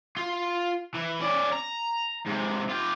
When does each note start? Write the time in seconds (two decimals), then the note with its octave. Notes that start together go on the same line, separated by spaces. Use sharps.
0.17 F4
0.94 E3
1.20 C#4 D5
1.52 A#5
2.26 G#2 C3
2.69 F4 G4